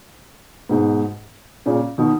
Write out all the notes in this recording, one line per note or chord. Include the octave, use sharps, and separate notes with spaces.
G#2 B2
A#2 C#3
B2 D#3